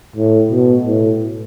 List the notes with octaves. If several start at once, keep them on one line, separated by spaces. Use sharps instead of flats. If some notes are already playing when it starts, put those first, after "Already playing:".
A2
B2
A2